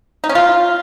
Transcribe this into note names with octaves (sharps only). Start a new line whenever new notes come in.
D#4
C#4
F4